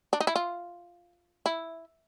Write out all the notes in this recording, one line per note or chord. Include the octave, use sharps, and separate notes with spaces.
D4
D#4
E4
F4
E4